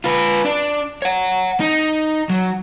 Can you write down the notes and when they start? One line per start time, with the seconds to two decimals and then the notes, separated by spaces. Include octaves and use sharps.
0.04 F4 B4
0.45 D4
1.02 C#5 F#5
1.60 D#4
2.30 F#3